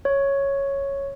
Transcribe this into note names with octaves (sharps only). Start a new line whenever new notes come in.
C#5